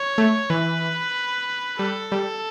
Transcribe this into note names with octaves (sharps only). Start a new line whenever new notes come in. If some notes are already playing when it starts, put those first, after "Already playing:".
Already playing: C#5
A3
E3 B4
G3 A4
G3